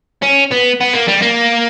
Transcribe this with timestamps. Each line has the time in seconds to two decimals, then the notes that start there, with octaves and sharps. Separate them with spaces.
0.22 C#4
0.51 B3
0.81 B3
0.93 A#3
1.08 G3
1.22 A#3